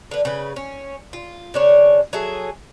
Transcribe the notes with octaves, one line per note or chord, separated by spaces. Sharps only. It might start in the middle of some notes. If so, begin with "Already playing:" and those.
D3 B4
C#3 B4
C#4
F4
C#3 D4 C#5
F#3 G#4 A4 E5